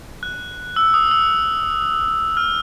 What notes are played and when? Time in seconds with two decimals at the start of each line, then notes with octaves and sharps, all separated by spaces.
0.23 F#6
0.76 E6
0.94 D#6
1.11 E6
2.37 F6